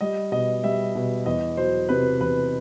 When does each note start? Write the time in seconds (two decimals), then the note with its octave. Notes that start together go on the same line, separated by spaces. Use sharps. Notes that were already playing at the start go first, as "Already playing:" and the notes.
0.01 G3 D#5
0.32 B2 D#5
0.64 G3 E5
0.95 B2
1.26 E2 D#5
1.57 F#3 C5
1.89 C3 B4
2.20 E2 B4